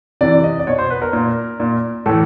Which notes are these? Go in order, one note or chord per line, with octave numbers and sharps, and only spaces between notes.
C3 E3 D5
D#5
D5
B2 C#5
C5
B4
A#4
A#2
A#2
A2 E3 A4